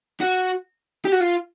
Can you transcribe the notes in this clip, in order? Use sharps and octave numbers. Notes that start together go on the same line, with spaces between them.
F#4
G4
F#4
F4